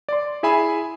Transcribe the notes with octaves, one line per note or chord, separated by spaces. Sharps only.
D5 C6
E4 G#4 E5 G#5 B5